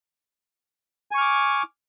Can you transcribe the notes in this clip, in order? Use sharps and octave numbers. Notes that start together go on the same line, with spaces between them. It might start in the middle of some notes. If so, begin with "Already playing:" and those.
G#5 C#6 D6 F6